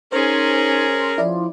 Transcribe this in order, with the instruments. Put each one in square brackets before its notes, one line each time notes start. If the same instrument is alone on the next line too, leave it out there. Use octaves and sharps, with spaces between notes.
[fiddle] C#4 G#4 [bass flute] D#4 [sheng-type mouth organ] A#4 [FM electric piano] C5 C6
[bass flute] F3 [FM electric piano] E4 D5